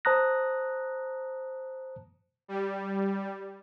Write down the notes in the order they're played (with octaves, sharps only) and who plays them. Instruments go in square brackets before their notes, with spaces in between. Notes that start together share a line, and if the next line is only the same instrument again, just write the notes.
[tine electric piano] C5 A5 A#5 D#6 F#6 A#6
[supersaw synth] G3